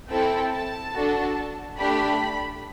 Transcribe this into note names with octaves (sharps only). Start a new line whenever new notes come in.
C4 E4 A4 G5
A5
D4 F#4 A4
A3 D4 G4 B5